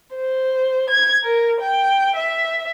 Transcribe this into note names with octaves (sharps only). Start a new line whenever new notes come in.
C5
G#6
A#4
G5
E5